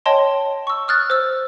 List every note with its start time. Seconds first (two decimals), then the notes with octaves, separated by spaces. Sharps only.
0.06 C#5 D#5 G5 A5 C6
0.67 C#6 E6
0.88 D#6 F6 F#6 A6
1.10 C5 E6